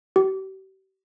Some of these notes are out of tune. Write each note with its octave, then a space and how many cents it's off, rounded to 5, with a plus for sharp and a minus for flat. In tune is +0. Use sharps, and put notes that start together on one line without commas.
G4 -40